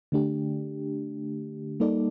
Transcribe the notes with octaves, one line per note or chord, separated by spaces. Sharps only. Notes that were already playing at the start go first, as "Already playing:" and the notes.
D3 A3 D4 G4
G3 A#3 D#4 A4 D5